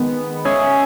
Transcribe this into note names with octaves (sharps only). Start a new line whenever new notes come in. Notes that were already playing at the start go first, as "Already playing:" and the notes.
Already playing: D#3 G#3 B3
G#3 C#4 G#4 C#5 E5